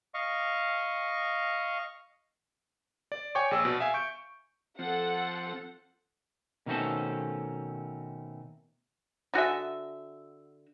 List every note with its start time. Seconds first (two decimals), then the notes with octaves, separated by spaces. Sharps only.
0.14 D#5 F5 C#6
3.12 D5
3.35 C#5 G5 G#5 C#6 D6
3.51 A#1 G#4 D5 E6
3.65 B2
3.80 E5 F5 G#5
3.94 C#6 G6 D7
4.79 F3 C4 A4 F#5
6.66 B2 D#3 A3 C4 C#4 A4
9.34 D3 F#4 G#4 E5